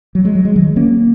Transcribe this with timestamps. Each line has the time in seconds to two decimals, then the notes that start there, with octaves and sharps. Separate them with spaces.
0.15 F#3
0.25 G#3
0.35 F#3
0.45 G#3
0.56 D#3 F#3
0.76 A#3 C#4